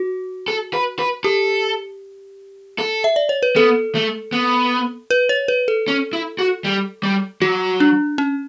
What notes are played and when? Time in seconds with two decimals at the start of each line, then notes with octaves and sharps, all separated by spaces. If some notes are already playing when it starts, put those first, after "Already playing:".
Already playing: F#4
0.48 A4
0.74 B4
0.99 B4
1.24 G4 A4
2.79 A4
3.04 E5
3.16 D5
3.29 C#5
3.43 B4
3.56 B3 A4
3.95 A3
4.32 B3
5.11 B4
5.29 C#5
5.48 B4
5.68 A4
5.88 C#4
6.13 E4
6.39 F#4
6.64 G3
7.03 G3
7.42 F#3 F#4
7.80 D4
8.18 C#4